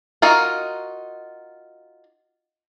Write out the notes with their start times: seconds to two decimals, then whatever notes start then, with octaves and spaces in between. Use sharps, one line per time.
0.22 D#4 F4 F#4 A#4